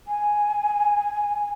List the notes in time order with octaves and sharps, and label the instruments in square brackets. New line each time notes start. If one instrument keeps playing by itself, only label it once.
[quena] G#5